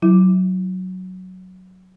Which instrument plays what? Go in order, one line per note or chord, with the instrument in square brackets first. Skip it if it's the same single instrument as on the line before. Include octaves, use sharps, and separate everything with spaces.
[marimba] F#3 E4